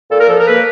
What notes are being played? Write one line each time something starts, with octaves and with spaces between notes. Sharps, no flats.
A#2 A4
A#4
F3 A4
A#4
A#3 B4